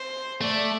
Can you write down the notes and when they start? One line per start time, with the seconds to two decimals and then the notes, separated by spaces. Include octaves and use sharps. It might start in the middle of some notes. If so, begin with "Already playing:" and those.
Already playing: C5
0.41 A3 D5